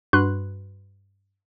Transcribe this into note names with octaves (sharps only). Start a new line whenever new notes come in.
G2 F#4 B4 C6 F#6